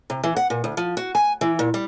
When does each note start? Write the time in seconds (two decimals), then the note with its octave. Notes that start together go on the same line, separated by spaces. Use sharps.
0.10 C3
0.23 E3
0.36 F#5
0.50 A#2
0.64 D2
0.77 F3
0.97 F#4
1.15 G#5
1.41 E3
1.59 A#2
1.74 G3